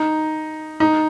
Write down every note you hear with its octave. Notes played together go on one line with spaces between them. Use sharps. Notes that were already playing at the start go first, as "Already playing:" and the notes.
Already playing: D#4
D#4